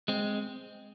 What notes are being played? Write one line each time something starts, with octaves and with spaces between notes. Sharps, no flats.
G#3 C4